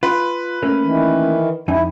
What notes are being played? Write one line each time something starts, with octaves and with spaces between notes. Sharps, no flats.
F4 B4
A3 A#3 C#4
D#3 E3
F2 D#4 E4 G#5